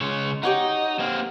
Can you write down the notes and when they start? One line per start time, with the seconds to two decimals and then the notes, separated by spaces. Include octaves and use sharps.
0.01 C#3 G#3 C#5
0.43 D#4 G4 C#5 F#5
0.99 A#3 C4